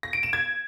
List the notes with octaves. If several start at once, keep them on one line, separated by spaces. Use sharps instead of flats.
A#6
D7
E7
G#6